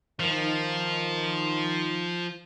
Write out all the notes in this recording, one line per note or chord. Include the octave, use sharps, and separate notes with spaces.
D#3 F3